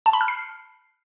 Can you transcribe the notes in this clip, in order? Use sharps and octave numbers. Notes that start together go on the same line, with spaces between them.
A5
B5
F6
C7